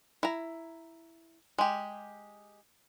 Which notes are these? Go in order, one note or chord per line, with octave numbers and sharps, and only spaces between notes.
E4 A#5
G#3 G4